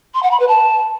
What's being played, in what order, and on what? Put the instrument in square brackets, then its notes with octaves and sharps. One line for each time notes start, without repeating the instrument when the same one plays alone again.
[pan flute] C6
F#5
B5
B4
A5